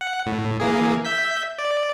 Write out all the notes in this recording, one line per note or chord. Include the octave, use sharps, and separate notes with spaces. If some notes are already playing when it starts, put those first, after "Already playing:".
F#5
A2
E3 A#3 G#4
E5 G6 B6
D5